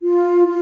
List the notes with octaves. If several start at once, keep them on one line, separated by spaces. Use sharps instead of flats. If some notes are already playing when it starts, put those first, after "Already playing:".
F4
F4